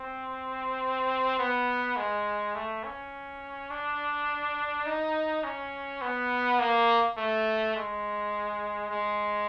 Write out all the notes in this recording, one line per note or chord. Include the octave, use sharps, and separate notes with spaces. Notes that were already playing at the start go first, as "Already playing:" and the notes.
Already playing: C4
B3
G#3
A3
C#4
D4
D#4
C#4
B3
A#3
A3
G#3
G#3